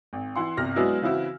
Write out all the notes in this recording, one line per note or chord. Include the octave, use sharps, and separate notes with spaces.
G#1
E3 E4 F#5 C6
G1 C2 C3 F6 A#6
F#3 G#3 B3 D4 E4 F#4
C#3 E3 C4 E4 F#4